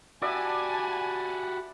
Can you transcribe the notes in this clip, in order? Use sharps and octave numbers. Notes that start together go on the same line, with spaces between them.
F#4 G4 D5 E5 F#5 G#5 A5 B5